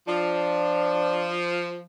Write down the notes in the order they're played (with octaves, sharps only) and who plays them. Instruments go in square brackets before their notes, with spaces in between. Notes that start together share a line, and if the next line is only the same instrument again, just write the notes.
[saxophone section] F3 [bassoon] D4